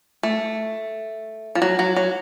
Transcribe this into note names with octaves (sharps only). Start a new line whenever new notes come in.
A3
F3
F#3
F#3
F#3